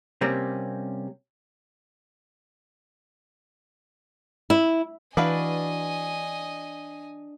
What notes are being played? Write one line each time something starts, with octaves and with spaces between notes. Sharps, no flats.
C3 G3 A#3 C4 C#4
E4
E3 D4 F#4 B4 D#5 F5 G#5